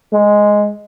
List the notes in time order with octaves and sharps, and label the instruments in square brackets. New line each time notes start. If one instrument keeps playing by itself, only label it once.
[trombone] G#3